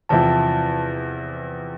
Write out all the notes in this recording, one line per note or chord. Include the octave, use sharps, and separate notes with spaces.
E2 C3 F3 A5